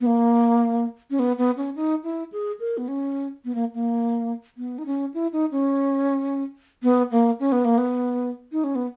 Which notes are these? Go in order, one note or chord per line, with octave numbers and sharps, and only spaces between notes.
B3
A#3
C#4
B3
B3
C#4
D#4
E4
G#4
A#4
B3
C#4
B3
A#3
A#3
B3
D#4
C#4
E4
D#4
C#4
B3
A#3
C#4
B3
A#3
B3
D#4
C#4
B3